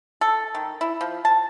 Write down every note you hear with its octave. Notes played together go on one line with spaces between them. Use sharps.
A4
D#3
E4
F3
A5